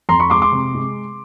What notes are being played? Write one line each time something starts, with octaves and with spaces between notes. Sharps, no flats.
F2 A#5 C6
B5 C#6
G#3 C6 D6
C6 D6
C3
G#3